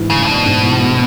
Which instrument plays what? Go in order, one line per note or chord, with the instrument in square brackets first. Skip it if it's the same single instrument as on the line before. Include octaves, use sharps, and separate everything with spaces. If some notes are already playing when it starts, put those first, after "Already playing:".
Already playing: [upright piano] G#2 E3 D4
[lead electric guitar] C#3 [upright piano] A3
[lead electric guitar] A#2
[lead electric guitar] B2 [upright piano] D4
[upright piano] G#2
E3
A3